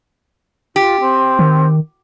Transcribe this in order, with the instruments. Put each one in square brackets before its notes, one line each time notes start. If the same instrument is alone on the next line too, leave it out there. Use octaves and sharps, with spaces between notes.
[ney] F4 [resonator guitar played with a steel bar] G4
[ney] C4
[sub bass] D#3